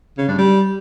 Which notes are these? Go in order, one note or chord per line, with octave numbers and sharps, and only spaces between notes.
C#3
G2
G3